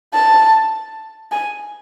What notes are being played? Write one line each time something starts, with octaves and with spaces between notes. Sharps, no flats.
A5
G#5